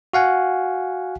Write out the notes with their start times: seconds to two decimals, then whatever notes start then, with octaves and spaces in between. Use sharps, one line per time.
0.13 F#4 F5 F#5 G#5